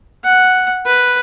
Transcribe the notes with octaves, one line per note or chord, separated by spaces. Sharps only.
F#5
B4